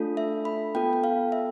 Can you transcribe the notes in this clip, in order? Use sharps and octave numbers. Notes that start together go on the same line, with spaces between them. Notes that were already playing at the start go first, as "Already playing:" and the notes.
Already playing: A3 D4 F4 A4
E5
B5
B3 F4 A4 G5
G5
F5
E5